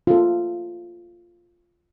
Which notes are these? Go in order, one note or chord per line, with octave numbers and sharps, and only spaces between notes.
F4 A4